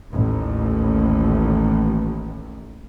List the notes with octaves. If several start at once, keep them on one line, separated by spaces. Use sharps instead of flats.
A1 D#2